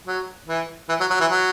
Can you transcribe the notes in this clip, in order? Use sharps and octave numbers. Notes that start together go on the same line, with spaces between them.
F#3
E3
E3
F#3
F#3
E3
F#3